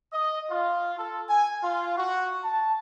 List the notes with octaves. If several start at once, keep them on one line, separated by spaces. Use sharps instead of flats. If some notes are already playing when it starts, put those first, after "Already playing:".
D#5
F4
A4
G#5
F4
F#4
A5